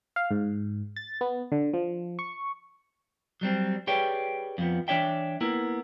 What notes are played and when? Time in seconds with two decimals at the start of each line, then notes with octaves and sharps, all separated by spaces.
0.16 F5
0.31 G#2
0.96 A6
1.21 B3
1.52 D3
1.74 F3
2.19 C#6
3.41 F#3 G3 C4
3.87 G4 G#4 B4 C#5 D5 G5
4.58 F2 F3 B3
4.88 E3 D4 C#5 D5 E5 G5
5.41 A#3 B3 E4 A#4